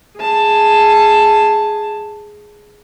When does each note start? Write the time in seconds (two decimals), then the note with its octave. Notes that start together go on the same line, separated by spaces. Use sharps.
0.18 G#4 A5